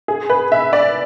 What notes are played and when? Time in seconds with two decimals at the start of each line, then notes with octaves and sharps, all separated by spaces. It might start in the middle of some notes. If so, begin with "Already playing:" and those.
0.08 G#4
0.30 B4
0.52 E5
0.73 D5